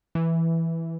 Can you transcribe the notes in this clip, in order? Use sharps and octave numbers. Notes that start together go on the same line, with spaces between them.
E3